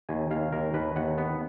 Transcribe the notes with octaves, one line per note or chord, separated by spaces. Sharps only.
D#2 G#5
D#2 F5
D#2 A#4
D#2 B4
D#2 F#5
B3